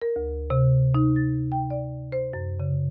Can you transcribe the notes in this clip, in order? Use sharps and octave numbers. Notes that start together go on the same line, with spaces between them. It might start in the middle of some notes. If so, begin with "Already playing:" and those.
A#4
D2
C3
D#4
A6
G5
D5
C5
F#2
C#3